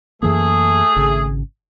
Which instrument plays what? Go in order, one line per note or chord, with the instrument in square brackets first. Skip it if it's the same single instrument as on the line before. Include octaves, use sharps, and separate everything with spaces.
[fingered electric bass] F#2 E3 A#3 [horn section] A3 G#4
[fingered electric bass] G#1 C#3